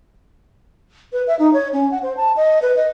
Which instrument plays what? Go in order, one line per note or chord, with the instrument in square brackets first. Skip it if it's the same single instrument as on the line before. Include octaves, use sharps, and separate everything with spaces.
[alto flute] B4
E5
D#4
C#5
C#4
F#5
C5
A5
D#5
B4
D#5